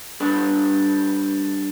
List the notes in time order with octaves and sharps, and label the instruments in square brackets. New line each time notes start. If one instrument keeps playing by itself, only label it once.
[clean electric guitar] G3 D4 A4 B4